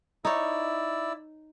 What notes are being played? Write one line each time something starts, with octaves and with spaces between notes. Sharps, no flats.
D#4 E4 C#5 D5 E6